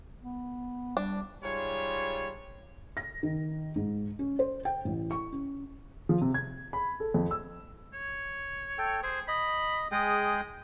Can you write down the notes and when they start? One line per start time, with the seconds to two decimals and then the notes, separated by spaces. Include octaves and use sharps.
0.22 B3
0.97 G3 D4
1.43 G#2 G3 F4 C#5
2.97 A#6
3.23 D#3
3.76 G#2
4.19 C#4
4.39 C5
4.65 G5
4.85 A1
5.11 C#6
5.32 C#4
6.09 F3
6.21 C3
6.34 G#6
6.73 B5
7.00 A4
7.14 F2
7.31 E6
7.93 C#5
8.78 A4 G5
9.03 G#4 C5
9.28 D#5 B5
9.92 G#3 G#4 D#5 G5